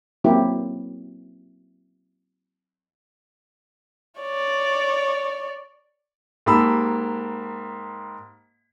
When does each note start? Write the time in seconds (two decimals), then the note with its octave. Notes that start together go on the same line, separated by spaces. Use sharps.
0.24 F#3 A#3 C4 E4 G4
4.21 C#5 D5
6.46 G#2 A#3 G4 A5 B5 E6